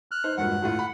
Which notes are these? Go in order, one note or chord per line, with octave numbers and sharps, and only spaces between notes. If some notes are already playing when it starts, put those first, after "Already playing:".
F6 F#6
D#4 C5
E1 G2 A#2 F#5
D2 A2 F4
B5